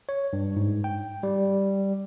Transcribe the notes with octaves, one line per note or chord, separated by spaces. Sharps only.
C#5
G2
G#2
G5
G3